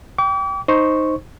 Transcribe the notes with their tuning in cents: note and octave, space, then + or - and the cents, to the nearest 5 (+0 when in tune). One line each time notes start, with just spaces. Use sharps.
G5 +0 D6 -40
D#4 +0 C5 +0 C#6 +0